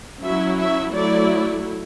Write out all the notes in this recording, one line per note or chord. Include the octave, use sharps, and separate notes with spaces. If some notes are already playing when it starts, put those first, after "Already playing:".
F#3 C#4 E4 E5
E5
F#3 A3 E4 D5